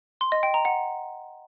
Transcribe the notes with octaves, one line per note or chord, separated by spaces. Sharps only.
C6
D#5
G5
A#5
F#5